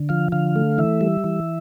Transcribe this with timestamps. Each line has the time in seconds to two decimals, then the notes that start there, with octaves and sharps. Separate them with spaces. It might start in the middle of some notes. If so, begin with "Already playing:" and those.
Already playing: D3
0.09 F3 F5
0.32 D3 F5
0.56 A3
0.78 E3 E5
1.01 G3
1.24 E3